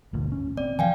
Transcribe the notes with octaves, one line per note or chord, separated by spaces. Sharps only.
G1 D2 A#2
C#4
C4 D5
E3 F3 F5 G5 G#5